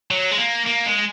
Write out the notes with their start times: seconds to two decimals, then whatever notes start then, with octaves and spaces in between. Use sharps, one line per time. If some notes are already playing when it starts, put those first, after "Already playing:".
0.11 F#3
0.32 G#3
0.38 A#3
0.66 A#3
0.86 G#3